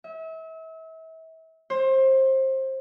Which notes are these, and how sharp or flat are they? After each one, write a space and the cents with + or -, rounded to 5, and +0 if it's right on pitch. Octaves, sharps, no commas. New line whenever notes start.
E5 -35
C5 +25